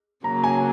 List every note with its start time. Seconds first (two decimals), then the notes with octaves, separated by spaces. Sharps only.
0.24 C#3 F#3 A#3 A#5
0.44 G#5